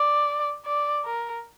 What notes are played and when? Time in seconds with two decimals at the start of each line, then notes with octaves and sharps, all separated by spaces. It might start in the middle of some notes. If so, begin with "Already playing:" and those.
Already playing: D5
0.66 D5
1.05 A#4